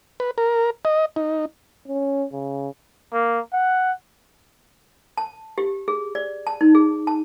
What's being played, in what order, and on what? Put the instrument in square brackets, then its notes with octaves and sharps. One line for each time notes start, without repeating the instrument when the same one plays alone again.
[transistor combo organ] B4
A#4
D#5
D#4
[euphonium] C#4
C#3
[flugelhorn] A#3
F#5
[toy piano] A5
G4
G#4
D5
A5
D#4
G#4
A5